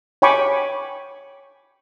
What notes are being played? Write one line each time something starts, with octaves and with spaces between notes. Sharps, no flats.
C#5 G5 G#5 B5 C#6 D6